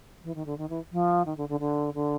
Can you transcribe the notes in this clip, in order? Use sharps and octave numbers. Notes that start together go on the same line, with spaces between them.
E3
D#3
D3
D#3
E3
F3
D#3
D3
D3
D3
D3